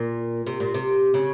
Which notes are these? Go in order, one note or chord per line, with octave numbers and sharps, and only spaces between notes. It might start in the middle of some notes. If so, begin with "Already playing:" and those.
Already playing: A#2
C3
A#2
C3
C#3